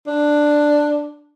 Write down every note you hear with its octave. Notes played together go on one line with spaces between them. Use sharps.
D4